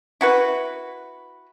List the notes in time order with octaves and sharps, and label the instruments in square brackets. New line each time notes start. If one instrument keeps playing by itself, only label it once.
[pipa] E4 F#4 B4